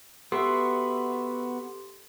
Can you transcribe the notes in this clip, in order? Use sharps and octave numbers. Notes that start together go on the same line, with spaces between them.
B3 F#4 G4 A4 E5 C6